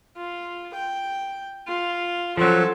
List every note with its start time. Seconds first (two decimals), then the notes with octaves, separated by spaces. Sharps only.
0.17 F4
0.74 G5
1.67 F4
2.37 F3 F#3 C#4 A4